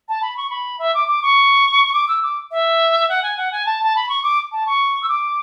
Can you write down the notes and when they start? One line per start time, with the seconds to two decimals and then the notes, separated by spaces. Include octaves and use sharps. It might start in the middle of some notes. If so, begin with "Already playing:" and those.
0.08 A5
0.22 B5
0.37 C#6
0.50 B5
0.79 E5
0.94 D6
1.08 D6
1.22 C#6
1.93 D6
2.08 E6
2.22 D6
2.51 E5
3.09 F#5
3.22 G#5
3.37 F#5
3.51 G#5
3.65 A5
3.83 A5
3.96 B5
4.09 C#6
4.23 D6
4.52 A5
4.66 C#6
5.02 E6
5.09 D6